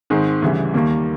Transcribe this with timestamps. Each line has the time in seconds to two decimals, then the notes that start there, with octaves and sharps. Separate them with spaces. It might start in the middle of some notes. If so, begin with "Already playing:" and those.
0.10 G#2 D#3 G#3 C4 D#4
0.42 D2 C#3 E3 G3
0.74 D#2 D#3 G3 A#3